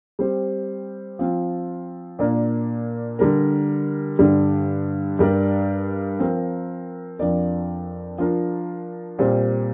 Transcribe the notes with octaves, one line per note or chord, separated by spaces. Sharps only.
G3 C4 G4 C5
F3 C4 F4
A#2 A#3 D4 A#4 D5
D3 G3 D4 A#4
G2 D3 G3 D4
G2 G3 D4 A#4 D5
F3 C4 A#4
F2 F3 D4 A#4 D5
F3 D4 F4 A#4
A#2 G3 C4 G4 C5